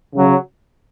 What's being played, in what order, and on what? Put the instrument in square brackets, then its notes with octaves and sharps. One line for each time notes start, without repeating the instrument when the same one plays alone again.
[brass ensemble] C#3 F#3